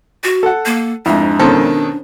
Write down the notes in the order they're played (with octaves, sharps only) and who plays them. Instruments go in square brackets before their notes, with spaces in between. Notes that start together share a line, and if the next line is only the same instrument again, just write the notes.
[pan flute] F#4
[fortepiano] A4 F#5
[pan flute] A#3
[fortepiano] F2 G#2 [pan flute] D4 [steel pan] E4
[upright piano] B2 D#3 A4 [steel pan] C#4 A#4 C5